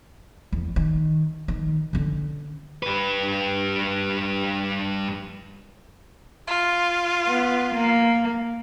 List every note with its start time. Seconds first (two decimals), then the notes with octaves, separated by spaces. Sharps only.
0.52 E2
0.76 D#3
1.48 D#3
1.93 D3 C#4
2.83 G2 B4
6.48 F4
7.27 B3
7.74 A#3